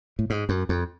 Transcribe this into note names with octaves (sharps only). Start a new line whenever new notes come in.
A2
G#2
F#2
F2